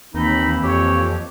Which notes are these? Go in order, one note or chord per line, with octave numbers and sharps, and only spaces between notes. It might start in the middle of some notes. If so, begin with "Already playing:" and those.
D#2 E3 A#3 C4 D#4 B5
F2 G4 C#5